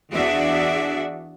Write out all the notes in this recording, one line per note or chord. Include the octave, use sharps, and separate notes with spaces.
E2 D4 F#4 G#4 D5 E5